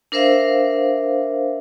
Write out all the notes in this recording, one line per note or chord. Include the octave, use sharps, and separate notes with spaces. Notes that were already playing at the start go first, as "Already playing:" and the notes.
D4 A#4 C5 E5 F5